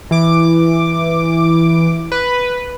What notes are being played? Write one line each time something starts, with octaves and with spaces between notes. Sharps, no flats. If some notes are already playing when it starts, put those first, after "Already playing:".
E3 D6
B4